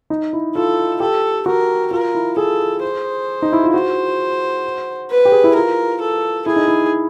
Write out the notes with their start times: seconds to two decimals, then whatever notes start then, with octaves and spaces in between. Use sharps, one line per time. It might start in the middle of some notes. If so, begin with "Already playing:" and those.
0.10 D#4
0.33 E4
0.55 F4 A4
1.00 G4 A4
1.46 F#4 A#4
1.91 F4 A#4
2.15 E4
2.37 G#4 A4
2.83 C5
3.42 D#4
3.53 E4
3.63 F4
3.74 F#4 C5
5.10 B4
5.25 G4
5.32 G#4
5.44 E4
5.55 F4 A#4
6.00 A4
6.46 E4 G#4
6.56 D#4
6.68 E4